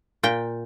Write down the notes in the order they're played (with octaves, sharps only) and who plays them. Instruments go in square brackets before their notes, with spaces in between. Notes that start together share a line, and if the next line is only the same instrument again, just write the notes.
[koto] A#2 G5